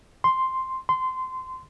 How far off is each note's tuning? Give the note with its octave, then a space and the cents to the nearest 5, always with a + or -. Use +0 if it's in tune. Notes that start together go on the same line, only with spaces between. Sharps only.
C6 +0
C6 -20